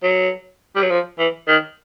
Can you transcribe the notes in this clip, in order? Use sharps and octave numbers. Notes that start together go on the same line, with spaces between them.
F#3
G3
F#3
F3
E3
D#3